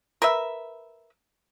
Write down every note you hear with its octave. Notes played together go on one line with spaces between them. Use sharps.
A#4 B4 E5